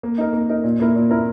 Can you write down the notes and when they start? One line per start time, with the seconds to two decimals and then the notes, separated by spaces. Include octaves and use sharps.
0.03 A#3
0.18 D#4 A#4
0.33 A#3
0.49 D#4 A#4
0.64 A#2
0.80 A#3 E4 A#4
0.95 A#2
1.10 A#3 E4 A#4